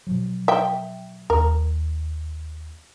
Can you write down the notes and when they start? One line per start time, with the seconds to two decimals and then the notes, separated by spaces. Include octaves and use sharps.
0.07 B2 F3 F#3
0.48 E5 G5
1.30 D#2 A#4